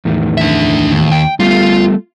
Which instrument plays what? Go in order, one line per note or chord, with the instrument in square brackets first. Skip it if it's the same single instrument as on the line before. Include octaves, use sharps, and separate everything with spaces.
[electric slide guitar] E2 A2 D#3
[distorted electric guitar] D4 E5
D#2
[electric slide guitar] G5
[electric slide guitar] G3 A3 B3 [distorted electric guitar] F4